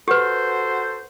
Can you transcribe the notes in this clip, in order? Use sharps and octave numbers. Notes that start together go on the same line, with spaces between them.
F#4 G4 A4 B4 C5